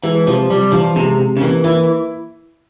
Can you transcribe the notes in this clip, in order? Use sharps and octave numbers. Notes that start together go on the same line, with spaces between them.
E3 G#3
C3 F3
C3 G3
E3 F3
C3 G#3
C3
C#3
E3 A#3
E3 E4